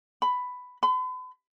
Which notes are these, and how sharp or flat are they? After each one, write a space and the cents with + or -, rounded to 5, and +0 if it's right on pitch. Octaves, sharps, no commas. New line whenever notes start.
B5 +10
B5 +45